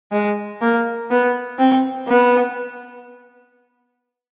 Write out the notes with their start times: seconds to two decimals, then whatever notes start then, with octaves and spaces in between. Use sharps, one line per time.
0.12 G#3
0.61 A#3
1.10 B3
1.59 C4
2.08 B3